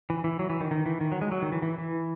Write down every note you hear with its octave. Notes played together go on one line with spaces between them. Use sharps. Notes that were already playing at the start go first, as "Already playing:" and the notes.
E3
E3
F#3
E3
D#3
D#3
E3
D#3
F#3
G#3
F#3
D#3
E3
E3
E3